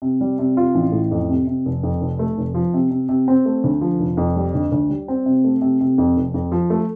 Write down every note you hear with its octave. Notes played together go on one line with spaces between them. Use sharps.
C3
G3
C3
F4
A1
A2
F2
C3
C3
F1
F2
F1
A3
F1
F3
C3
C3
C3
C4
A3
D2
F3
F1
F2
G3
D2
D2
G3
C4
C3
A3
C3
C3
F2
F1
F2
F3
A3